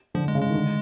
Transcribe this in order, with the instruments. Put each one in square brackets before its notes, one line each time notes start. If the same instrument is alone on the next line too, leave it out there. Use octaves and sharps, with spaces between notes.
[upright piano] D3 [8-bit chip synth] F3
[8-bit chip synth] G#3
[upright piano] C#3
[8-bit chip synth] G#3
[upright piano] D#3
D3